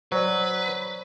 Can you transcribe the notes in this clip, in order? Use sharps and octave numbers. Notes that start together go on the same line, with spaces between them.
F#3 B4 C5 D5 G#5